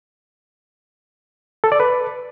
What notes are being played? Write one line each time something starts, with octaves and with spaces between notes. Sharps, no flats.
A4
D5
B4